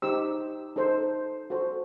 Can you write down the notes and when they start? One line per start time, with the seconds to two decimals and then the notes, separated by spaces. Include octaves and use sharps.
0.02 D#4 G4 C5 E6
0.76 D#4 A4 C5
1.50 F#4 A4 C5